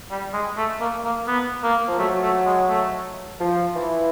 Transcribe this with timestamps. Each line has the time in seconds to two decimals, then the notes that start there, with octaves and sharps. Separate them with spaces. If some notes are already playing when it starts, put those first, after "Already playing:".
0.11 G3
0.33 G#3
0.57 A3
0.80 A#3
1.05 A#3
1.27 B3
1.63 A#3
1.87 F3
1.99 F#3 A3
2.23 A3
2.46 G#3
2.69 A3
3.40 F3
3.75 E3